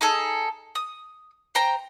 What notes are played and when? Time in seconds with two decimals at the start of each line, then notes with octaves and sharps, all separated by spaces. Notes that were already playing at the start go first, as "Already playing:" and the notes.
0.01 D#4 G#4 A4
0.75 D#6
1.55 C5 G5 A#5